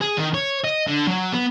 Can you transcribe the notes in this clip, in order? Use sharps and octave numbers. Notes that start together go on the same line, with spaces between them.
G#4
D#3
C#5
D#5
D3
F#3
B3